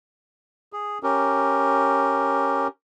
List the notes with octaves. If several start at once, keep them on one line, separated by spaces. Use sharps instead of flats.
G#4
C#4 G4 A#4